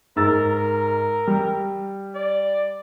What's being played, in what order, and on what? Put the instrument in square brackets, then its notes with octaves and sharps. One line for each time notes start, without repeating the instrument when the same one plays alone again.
[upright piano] G#2 E6 A6 [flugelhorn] A#4
[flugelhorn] A#4
[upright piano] G3
[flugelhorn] D5